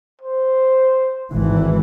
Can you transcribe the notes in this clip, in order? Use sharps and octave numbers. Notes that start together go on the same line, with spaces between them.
C5
G#1 E3